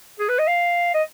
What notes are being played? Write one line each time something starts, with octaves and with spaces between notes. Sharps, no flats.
G#4
B4
D#5
F5
D#5